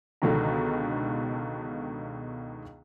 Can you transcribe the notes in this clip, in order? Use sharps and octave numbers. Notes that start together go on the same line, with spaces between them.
C#2 B2 D3 D#3 D4 A#5